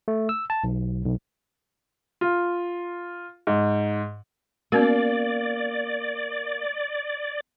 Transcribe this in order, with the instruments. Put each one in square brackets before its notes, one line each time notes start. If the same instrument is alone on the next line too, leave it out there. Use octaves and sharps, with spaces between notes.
[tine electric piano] A3
E6
A5
B1
B1
[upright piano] F4
G#2
[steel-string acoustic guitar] A#3 [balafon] B3 C#4 F#4 [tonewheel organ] D5